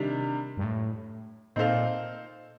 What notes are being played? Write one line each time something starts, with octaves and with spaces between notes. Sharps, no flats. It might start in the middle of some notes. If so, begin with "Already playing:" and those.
Already playing: C3 D#3 G3 D4
G2
A2
A#2 C4 D#4 A4 C5 F5